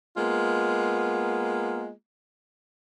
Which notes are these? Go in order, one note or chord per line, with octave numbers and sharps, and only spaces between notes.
G#3 A#3 B3 F4